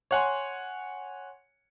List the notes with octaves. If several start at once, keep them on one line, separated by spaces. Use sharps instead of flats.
C#5 F#5 G#5 C6